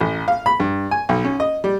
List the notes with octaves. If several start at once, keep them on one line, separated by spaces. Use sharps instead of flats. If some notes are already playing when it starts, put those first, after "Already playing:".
A1
F5
B5
G2
G#5
B1
C#4
D#5
G3